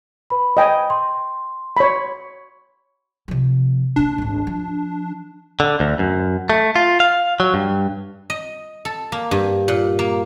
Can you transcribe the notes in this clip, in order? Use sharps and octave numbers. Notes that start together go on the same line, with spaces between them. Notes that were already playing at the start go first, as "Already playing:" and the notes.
B4 B5
D#5 G5 G#5
C6
C#5 B5
C3 F3
A#2 D3 D4
G#1 D2
F3
D3
D2
F#2
A3
F4
F5
F#3
G2
D#5
A4
A#3
G2
A#2
A#3